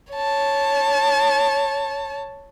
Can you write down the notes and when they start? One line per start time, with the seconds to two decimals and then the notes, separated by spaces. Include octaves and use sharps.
0.13 C#5 A5